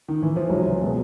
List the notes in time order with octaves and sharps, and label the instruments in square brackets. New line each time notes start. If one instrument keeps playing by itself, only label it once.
[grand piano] D#3
E3
F3
[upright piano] C#2 C3 E3 [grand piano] F#3
[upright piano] B2 G#3 B3